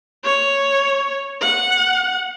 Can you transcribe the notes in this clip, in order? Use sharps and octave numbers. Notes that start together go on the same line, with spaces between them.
C#5
F#5